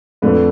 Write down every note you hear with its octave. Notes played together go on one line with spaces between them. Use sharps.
F2 D3 F3 A3 B4